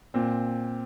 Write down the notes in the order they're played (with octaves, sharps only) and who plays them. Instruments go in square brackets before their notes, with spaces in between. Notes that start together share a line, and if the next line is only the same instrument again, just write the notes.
[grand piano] A#2 C4